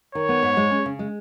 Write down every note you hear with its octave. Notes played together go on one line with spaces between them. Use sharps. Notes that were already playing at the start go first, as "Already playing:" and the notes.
D#3 C#5
B3
G#2
G#3
C#4
C#3
G#3